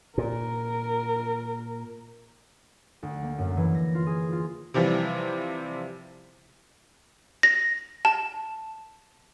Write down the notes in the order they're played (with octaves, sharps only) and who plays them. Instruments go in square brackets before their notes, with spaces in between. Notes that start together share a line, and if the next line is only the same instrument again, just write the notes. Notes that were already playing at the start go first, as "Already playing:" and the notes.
[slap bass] A#2 [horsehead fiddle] A#4
[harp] D2
A#3
F#2
E3
A#6
F4
G#4
F4
[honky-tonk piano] C3 E3 F3 G3
[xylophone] A#6
A5